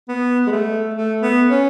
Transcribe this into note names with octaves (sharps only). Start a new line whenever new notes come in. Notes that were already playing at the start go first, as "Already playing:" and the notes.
B3
G#3
A3
A3
B3
C#4